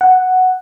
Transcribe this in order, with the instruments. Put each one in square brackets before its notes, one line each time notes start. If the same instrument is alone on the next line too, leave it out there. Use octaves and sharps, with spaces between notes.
[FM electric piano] F#5